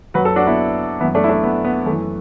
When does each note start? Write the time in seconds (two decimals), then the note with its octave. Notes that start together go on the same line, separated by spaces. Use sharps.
0.14 F#2 F#3 F#4 B4
0.25 A4
0.36 D4 F#4
0.47 B3 E4
1.00 E3 B3 E4
1.05 F#2
1.15 A3 D4
1.24 E4
1.29 A3 D4
1.43 B3
1.65 B3
1.86 F#2 A3
1.90 E3